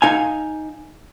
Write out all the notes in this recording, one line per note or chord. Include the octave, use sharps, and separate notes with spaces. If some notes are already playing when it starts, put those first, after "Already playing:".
D#4 F5 G#5